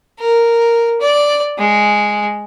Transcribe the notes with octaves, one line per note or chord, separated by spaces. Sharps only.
A#4
D5
G#3